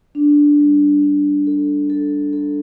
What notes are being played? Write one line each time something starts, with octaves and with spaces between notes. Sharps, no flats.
D4
G3
D4
A4
A4
A4